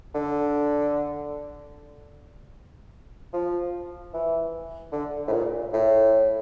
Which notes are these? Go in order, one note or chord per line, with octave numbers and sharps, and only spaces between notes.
D3
F3
E3
D3
A2
A#2
A2